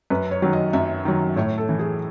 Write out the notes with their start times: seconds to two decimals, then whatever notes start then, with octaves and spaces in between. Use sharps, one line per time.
0.10 F#2 B4
0.31 C#5
0.42 D#3 F#3
0.53 D#5
0.73 F#2 E5
1.05 D#3 F#3
1.36 A2 C#5
1.58 A4
1.69 E3
1.79 G#4